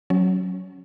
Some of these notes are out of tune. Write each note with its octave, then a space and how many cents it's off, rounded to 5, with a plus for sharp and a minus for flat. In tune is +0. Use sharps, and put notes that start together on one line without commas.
F#3 +0 C#4 -10